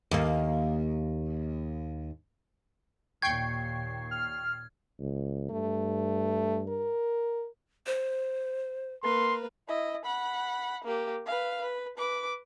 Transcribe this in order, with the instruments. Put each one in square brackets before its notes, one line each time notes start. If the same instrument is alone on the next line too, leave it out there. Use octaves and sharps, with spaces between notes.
[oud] D#2 A#3
[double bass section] D#2 A#2 [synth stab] G5 C#6 C7 [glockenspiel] G#6
[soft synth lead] F6
[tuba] C#2
[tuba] G2 [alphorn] A3
[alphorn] A#4
[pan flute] C5
[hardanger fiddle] A#3 B4 [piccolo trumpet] C6
[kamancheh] E4 D#5
F#5 B5
A#3 G4
B4 F5
B4
B4 D6